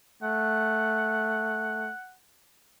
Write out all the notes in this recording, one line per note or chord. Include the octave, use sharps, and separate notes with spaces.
A3 F#5